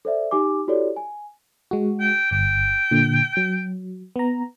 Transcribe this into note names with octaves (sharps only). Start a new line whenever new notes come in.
A4 C5 D5 E5
D#4 G4 G#5 D6
E4 F#4 G4 A4 C#5 D5
G#5
G#3 F#4
G5
G1 G5
A#2 D3
F#3
B3 A#5